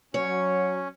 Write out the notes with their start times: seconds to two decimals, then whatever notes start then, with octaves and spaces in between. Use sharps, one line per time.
0.14 F#3 C#4 C#5